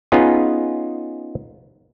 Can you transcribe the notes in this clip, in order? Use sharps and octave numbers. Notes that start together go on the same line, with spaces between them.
B3 C#4 D#4 F4 G#4